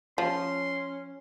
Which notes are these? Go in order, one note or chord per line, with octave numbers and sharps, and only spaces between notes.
F3 C#4 C6